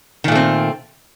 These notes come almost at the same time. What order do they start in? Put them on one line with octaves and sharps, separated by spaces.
D#3 A#2 A3 C4